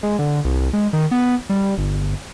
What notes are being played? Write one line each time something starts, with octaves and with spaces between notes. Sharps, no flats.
G#3
D3
C2
G#3
D#3
B3
G3
G1